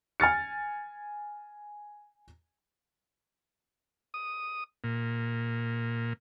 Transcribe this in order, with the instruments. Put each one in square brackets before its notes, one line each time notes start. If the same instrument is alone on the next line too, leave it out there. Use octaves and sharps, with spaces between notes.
[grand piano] G#5 F6 A6 C#7
[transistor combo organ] D#6
A#2